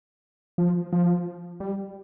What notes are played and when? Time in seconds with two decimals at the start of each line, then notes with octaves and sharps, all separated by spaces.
0.58 F3
0.93 F3
1.60 G3